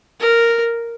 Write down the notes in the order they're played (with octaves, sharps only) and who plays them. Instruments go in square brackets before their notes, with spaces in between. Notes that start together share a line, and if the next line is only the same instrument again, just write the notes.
[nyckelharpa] A#4